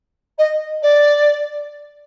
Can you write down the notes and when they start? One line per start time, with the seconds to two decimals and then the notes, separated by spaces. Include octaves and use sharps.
0.38 D#5
0.82 D5